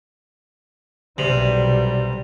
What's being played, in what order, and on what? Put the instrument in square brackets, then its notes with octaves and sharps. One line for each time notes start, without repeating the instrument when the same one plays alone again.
[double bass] B1 G3 [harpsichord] C3